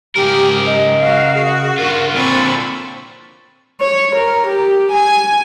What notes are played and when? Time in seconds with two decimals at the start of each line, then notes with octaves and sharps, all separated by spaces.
0.16 G#2 C#3 G4 A#4
0.66 D#5
1.00 F#4 F5
1.34 F#4 G#4
1.78 G2 F4 A#4
2.16 A#2 D3 C4 A5 B5 C#6
3.80 C#5
4.16 A#4
4.47 G4
4.92 G#5